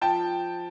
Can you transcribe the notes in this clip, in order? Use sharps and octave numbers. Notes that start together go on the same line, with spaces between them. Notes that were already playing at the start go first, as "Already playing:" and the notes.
F3 G5 A5